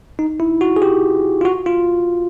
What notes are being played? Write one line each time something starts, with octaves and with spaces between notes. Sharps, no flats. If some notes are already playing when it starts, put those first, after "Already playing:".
D#4
E4
F#4
G#4
G4
F4
F#4
F4